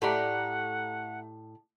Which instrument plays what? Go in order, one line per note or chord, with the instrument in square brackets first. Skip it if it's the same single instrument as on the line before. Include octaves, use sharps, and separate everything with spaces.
[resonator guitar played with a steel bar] A2 G4 D5 [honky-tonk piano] A3 A#5 [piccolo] F#5